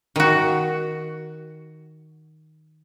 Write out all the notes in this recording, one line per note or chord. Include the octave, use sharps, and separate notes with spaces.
D#3 F#4